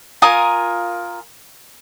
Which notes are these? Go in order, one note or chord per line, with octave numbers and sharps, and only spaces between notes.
F4 A#4 G#5 D#6